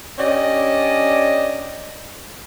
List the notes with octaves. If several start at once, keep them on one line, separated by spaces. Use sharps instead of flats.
C#4 D4 G4 D5 D#5